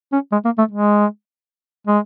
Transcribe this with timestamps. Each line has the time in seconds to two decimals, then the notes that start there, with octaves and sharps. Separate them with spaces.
0.12 C#4
0.32 G#3
0.45 A#3
0.58 A3
0.71 G#3
1.87 G#3